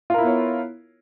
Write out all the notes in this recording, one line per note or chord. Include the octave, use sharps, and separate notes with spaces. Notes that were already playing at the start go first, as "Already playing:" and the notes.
B3 E4 F4 A#4 C#5